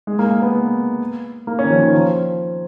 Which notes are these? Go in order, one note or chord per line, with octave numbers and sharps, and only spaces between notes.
G#3
A#3
A#3
B3
A#3
C#4
D#3
F3
D#3
F3